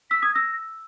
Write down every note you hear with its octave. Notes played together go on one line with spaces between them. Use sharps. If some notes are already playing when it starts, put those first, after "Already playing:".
E6 B6
D#6 G#6
E6 A#6